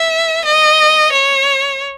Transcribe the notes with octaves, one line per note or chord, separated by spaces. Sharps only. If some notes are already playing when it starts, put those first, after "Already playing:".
Already playing: E5
D#5
C#5